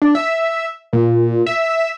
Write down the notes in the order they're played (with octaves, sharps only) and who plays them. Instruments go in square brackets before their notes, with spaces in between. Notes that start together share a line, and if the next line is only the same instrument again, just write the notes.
[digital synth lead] D4
E5
A#2
E5